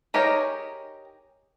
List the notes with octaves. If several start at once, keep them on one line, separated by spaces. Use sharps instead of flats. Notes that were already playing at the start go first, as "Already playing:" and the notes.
D#4 G4 G#4 A#4 C#5